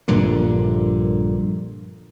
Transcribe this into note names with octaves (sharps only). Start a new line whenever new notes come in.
A#1 G2 A#2 D3